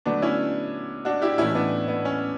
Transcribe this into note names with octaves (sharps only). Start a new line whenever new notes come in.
D3 F#3 A3 B3 D4
C#4 E4
D4 F#4
E4 G4
A2 E3 A3 C#4 E4
B3 D4
B3
C#4